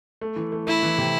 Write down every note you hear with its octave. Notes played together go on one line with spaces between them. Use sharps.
A3
E3
A3
A3 E4
E3
C3